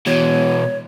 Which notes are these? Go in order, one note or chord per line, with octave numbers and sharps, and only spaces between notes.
B2 E3 C#5